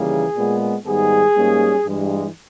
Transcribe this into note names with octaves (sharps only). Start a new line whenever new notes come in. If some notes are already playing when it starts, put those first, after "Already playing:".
Already playing: D#2 C#3 E3 G3 A#3 G#4
A#2 G#3 B3
G#2 D#3 G3 B3 G#4
G#2 G3 A#3 C#4
G2 E3 G#3